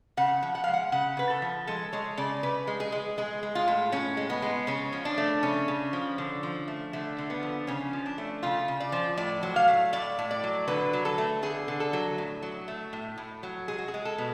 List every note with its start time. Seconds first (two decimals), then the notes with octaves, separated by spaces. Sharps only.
0.17 C#3 F#5
0.43 F3
0.55 F#5
0.64 F5
0.68 G#3
0.73 F#5
0.92 C#3 F#5
1.17 C#3 B4
1.30 A4
1.42 F3
1.67 G#3 A4
1.93 G#3 C#5
2.17 C#3 D5
2.43 C#3 B4
2.67 G#3
2.80 G#4
2.92 G#3
3.18 G#3 G#4
3.43 G#3
3.55 F4
3.68 A2
3.92 A2 C#4
4.17 G#3
4.30 B3
4.42 G#3
4.67 C#3 C#4
4.92 F3
5.05 D4
5.18 A3
5.43 C#3 C#4
5.68 C#3
5.93 F3
6.18 D3
6.43 F3
6.68 A3
6.93 D3 A3
7.18 D3
7.30 B3
7.43 F3
7.67 C#3 C#4
7.93 F3
8.06 D4
8.18 A3
8.43 C#3 F4
8.68 C#3
8.80 D5
8.92 F3
9.17 A2 D5
9.43 F#3
9.56 F5
9.68 A3
9.93 A2 D5
10.19 A2
10.31 D5
10.44 F#3
10.68 D3 B4
10.93 F#3
11.05 A4
11.18 A3
11.42 D3 G#4
11.68 D3
11.80 A4
11.93 F#3
12.18 A2
12.42 F#3
12.68 A3
12.93 A2
13.18 A2
13.43 F#3
13.68 G#3 G#4
13.78 F#4
13.88 G#4
13.94 G#3
14.05 A4
14.18 B2